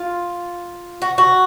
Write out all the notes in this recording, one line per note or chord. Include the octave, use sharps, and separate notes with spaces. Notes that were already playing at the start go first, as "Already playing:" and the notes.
Already playing: F4
F#4
F#4